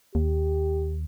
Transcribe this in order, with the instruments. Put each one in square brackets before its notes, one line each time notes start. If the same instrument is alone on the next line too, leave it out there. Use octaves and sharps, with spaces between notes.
[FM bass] D#2 [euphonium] G4